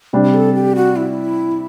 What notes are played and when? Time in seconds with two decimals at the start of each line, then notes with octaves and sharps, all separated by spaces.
0.13 C3 G3 D4
0.24 G4
0.34 A4
0.55 G4
0.76 F#4
0.96 E4